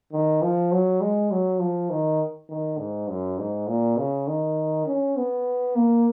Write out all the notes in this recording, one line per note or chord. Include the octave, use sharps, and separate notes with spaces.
D#3
F3
F#3
G#3
F#3
F3
D#3
D#3
G#2
F#2
G#2
A#2
C#3
D#3
C#4
B3
A#3